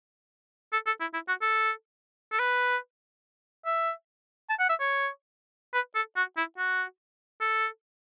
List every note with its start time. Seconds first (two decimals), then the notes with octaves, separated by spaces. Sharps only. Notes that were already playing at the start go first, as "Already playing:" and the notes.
0.73 A4
0.86 A4
1.01 E4
1.14 E4
1.28 F#4
1.42 A4
2.32 A4
2.39 B4
3.66 E5
4.49 A5
4.59 F#5
4.69 E5
4.80 C#5
5.74 B4
5.95 A4
6.16 F#4
6.37 E4
6.58 F#4
7.41 A4